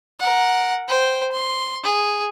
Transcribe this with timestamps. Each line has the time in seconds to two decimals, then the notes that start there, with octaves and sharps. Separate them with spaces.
0.20 A#4 F#5
0.88 C5 G5
1.32 C6
1.84 G#4